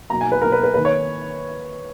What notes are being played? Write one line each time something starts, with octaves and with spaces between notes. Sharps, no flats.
B2 F#3 A#3 A#5
G#5
B4
B2 F#3 A#3 A#4
B4
B4
D#3 A#3 B4
C#5